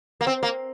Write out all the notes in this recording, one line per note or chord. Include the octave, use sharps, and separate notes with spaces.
A#3
C4
A#3